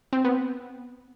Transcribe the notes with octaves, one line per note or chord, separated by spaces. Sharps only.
C4
B3